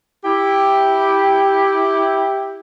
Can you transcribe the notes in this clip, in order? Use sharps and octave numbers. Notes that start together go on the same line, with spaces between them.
E4 G4